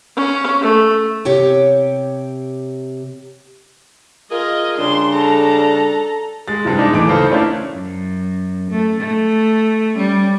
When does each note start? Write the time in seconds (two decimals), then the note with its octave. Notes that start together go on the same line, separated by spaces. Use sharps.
0.16 C#4
0.61 A3
1.25 C3 G4 C#5 G5
4.32 F4 G#4 A#4 D#5
4.78 C#3 G3 D4 C6
5.13 A4 A#5
6.48 G#3 A6
6.65 G2 C3 F3
6.78 G#3 D4 D#4
6.93 D#1 E3 A3 D6 D7
7.08 C#3 D#4 F4 A4 C5
7.31 A3 C#4 D4 E4 A#4 F5
7.73 F#2
8.71 A3
9.01 A3
9.95 G3 C#4